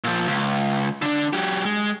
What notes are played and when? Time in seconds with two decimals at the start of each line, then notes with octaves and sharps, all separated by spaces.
0.04 A#2 F3
0.28 C#2
1.02 D3 D4
1.33 F#3 G4
1.65 G#3